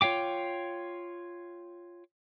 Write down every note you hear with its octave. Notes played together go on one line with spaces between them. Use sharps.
F4 C#5 F5 G5 D6